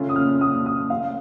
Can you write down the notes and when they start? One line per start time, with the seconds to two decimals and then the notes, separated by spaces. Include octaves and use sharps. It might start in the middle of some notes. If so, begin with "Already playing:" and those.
Already playing: C#3 A3 C#4 F4
0.09 D#6
0.16 F6
0.41 D#6
0.66 D#6
0.90 F5